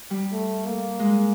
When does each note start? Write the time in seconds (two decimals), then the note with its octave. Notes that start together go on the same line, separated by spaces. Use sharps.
0.10 G3
0.32 A3
0.66 A#3
0.99 G#3